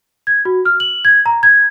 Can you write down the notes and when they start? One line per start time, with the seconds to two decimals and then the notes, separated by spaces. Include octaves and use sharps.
0.27 G#6
0.45 F#4
0.65 F6
0.80 F#7
1.05 G#6
1.26 A#5
1.43 G#6